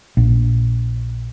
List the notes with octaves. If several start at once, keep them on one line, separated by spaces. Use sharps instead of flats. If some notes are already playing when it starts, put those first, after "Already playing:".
A#1